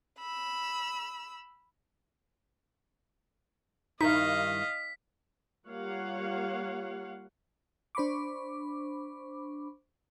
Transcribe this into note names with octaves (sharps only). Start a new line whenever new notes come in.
B5 E6
G2 D#3 D#4 E4 D#5 F5 B6
G3 A#3 F4 C#5 F5 F#5
D4 C5 B5 C#6 D6